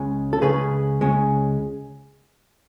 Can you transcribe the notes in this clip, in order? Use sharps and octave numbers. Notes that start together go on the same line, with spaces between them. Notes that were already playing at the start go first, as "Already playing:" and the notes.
Already playing: C#2 C#3 G#3 C#4
A4
C#2 C#3 G#3 C#4 G#4 B4
C#2 C#3 G#3 C#4